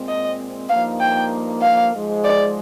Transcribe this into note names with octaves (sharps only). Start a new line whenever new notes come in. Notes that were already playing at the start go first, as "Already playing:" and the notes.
Already playing: A#2 G#3 C4
D#5
G2 F3 A#3 D#4 F5
G5
F5
G#2 F3 G#3
D5